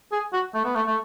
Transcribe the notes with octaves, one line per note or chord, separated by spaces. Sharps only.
G#4
F#4
A3
B3
A3
A3